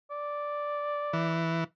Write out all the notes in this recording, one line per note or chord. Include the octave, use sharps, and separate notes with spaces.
D5
E3